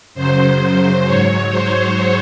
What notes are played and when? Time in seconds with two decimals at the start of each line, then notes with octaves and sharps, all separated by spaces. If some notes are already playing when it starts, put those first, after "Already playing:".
0.14 F#2 C#3 F#3 C5
1.04 G#2 F#3 C#5
1.49 C5